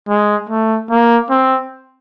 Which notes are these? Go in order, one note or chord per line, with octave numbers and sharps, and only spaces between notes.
G#3
A3
A#3
C4